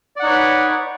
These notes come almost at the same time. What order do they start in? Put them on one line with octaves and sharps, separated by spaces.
D5 F#5 D#4 C#5 B4